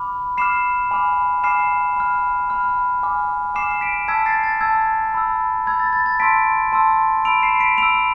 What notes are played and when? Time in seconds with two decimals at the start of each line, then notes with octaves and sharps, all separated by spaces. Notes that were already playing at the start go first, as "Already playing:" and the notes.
Already playing: B5 D6 F6
0.38 B5 D6 F6 C7 E7
0.91 G#5 B5 D6 F6
1.44 G#5 B5 D6 F6 C7 E7
1.96 B5 F6
2.50 B5 F6
3.03 G#5 D6 F6
3.55 G#5 D6 F6 C7 E7
3.81 B6 D7
4.08 A5 E6 G#6 B6
4.26 A6 C7
4.43 A6
4.61 A5 E6 G#6
5.14 B5 E6
5.67 B5 E6 G#6
5.79 A6
5.93 A6
6.06 A6
6.20 A5 C6 E6 B6 D7
6.72 A5 C6 E6
7.25 B5 E6 D7 F7
7.42 C7 E7
7.60 B6 D7
7.78 B5 E6 D7 F7